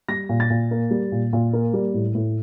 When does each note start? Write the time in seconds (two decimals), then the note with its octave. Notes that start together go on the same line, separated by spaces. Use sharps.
0.08 G3 A#6
0.29 A#2
0.40 A6
0.50 A#2
0.71 A#3
0.91 G3
1.12 A#2
1.33 A#2
1.53 A#3
1.74 G3
1.94 A2
2.15 A2